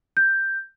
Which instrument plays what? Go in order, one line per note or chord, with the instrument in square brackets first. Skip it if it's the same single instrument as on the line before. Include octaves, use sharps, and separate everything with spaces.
[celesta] G6